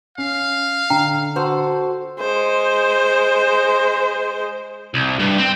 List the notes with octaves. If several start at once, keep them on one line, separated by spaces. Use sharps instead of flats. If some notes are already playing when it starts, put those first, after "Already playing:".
C#4 F5
D3 G5 A#5
F#4 A4 C5
G#3 C5
C2
G2
C4